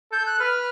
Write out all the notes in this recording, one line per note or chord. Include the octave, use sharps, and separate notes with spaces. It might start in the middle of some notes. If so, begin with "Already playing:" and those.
A4 G6
F#6
B4 F6